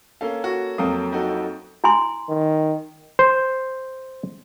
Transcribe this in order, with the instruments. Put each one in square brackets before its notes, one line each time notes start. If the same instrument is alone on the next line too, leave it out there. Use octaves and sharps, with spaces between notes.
[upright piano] A#3 C#4 A4 [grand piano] F5
[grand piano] F#4
[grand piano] F2 F#3 A#3 [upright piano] A4 F5 D#6
[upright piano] D#4 F#4 A4
[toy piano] E4 G#5 C6
[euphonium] D#3
[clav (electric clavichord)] C5